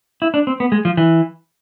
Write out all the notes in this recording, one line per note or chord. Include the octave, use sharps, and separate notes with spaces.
E4
D4
C4
B3
G#3
F3
E3